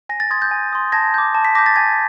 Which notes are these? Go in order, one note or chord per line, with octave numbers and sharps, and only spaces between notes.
G#5 A#6
A6
C6 D#6 G#6
G6 A6
G#5
C6 D#6
A5 G#6 A#6
D6 G6
A5
B6
D6 G6 A#6
A6
G#5 G#6